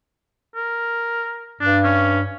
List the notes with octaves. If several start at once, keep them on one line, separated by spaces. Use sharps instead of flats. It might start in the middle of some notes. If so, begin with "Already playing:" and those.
A#4
G2 D4
C#4